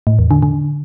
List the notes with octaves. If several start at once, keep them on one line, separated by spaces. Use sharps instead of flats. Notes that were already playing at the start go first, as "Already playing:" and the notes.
A2
E2
D3
D3